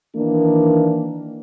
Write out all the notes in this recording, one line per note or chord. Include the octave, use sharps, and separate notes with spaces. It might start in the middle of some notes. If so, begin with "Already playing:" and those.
D#3 E3 A#3 D4